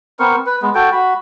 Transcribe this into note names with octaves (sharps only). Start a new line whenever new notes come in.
B3 C4 A#4 C#6
B4
G#3 B3
F#4 A4 G5
F#4 B5